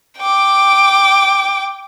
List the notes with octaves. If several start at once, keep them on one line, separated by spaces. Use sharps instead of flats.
G5 D6